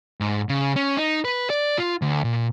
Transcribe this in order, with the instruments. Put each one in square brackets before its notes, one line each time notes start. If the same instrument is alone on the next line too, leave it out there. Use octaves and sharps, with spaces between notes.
[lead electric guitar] G#2
C#3
C#4
D#4
B4
D5
F4
D2
A#2